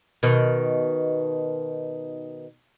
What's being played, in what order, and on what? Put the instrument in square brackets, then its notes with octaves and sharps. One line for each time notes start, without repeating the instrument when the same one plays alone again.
[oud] B2 D#3